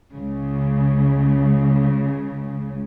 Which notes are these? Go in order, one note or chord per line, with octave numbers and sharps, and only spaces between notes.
C#2 C#3